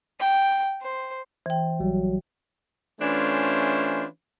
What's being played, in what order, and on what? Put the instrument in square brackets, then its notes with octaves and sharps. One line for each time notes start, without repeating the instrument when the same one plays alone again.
[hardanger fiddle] G5
C5
[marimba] E3 G5 [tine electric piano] C5
[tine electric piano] A#1 G3 [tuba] F#3
[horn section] E3 A3 C#4 D4 F4 C5